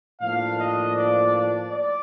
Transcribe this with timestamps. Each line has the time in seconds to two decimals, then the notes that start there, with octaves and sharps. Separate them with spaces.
0.21 A2 F3 A#3 D4 F5
0.59 D#5
0.97 D5
1.34 D5
1.72 D5